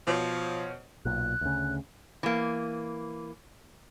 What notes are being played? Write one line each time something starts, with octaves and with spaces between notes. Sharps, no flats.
B2 F3 C5 C#5
B1 A#2 F#6
D2 C#3
E3 A#3